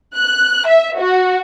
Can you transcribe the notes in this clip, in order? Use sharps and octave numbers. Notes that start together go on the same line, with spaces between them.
F#6
E5
F#4